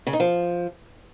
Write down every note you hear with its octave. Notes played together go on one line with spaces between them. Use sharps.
C#3
D#4
F3